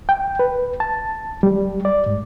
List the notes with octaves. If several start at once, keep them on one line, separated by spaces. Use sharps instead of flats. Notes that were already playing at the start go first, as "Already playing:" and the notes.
G5
B4
A5
G3
D5
G#2